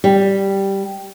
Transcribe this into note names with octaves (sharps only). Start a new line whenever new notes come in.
G3